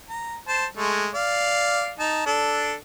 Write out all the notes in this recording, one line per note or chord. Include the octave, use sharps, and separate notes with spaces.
A#5
C5 A5
G#3 A3
D5 F5
D#4 A5
D4 A4